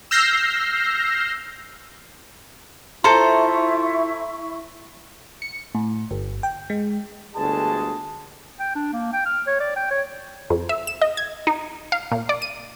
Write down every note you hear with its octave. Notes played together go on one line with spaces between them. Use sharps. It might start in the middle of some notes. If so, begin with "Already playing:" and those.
E6 F6 G6 A#6 C7
E4 F4 A4 C5 E5 A#5 C6 C#6
C#7
A2
G1
G5
G#3
G1 D2 G#3 G#4 A5
G5
D4
A#3
G5
F6
C#5
D5
G5
C#5
F2
E5
E7
D#5
G#6
D#4
F5
A#2
D5
D#7